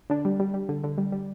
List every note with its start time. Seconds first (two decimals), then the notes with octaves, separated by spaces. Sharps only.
0.10 D3 D4
0.25 G3
0.40 G3
0.54 G3
0.69 D3
0.84 D3
0.98 G3
1.12 G3